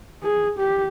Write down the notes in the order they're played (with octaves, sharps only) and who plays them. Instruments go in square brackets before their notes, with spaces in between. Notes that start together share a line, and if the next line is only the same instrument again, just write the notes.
[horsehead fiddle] G#4
G4